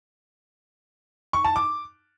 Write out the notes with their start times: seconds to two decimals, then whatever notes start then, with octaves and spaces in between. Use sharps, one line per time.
1.33 C#6
1.45 A5
1.56 D6